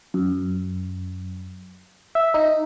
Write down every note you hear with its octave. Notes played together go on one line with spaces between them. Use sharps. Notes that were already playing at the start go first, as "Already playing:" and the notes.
F#2
E5
D#4